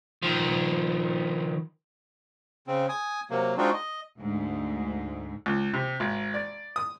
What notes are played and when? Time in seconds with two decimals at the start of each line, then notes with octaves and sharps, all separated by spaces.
0.23 D#3 F3
2.67 C#3 C4
2.89 G#5 D#6
3.31 C3 F#3 A#3
3.58 G#3 C4 D4 D#4 F4 F#4
3.74 D#5
4.17 D2 G#2
5.46 C#2
5.74 C3
6.00 G#1
6.34 D5
6.76 D#6